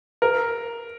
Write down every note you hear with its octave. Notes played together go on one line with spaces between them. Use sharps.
A#4